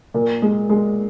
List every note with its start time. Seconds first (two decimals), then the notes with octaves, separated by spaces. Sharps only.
0.14 A#2
0.42 G#3
0.69 G#3